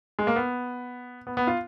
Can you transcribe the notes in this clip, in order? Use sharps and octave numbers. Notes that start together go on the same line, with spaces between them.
G#3
A#3
B3
B3
B3
F4